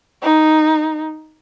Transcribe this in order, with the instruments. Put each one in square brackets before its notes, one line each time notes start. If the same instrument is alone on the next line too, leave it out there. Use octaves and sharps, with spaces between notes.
[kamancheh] D#4